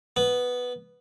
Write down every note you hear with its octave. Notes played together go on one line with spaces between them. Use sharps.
B3